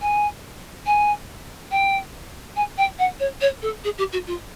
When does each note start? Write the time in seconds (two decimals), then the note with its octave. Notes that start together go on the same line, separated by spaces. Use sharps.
0.01 G#5
0.86 G#5
1.71 G5
2.56 G#5
2.77 G5
2.98 F#5
3.19 C#5
3.41 C#5
3.62 A4
3.84 G#4
3.98 G4
4.12 F#4
4.26 F4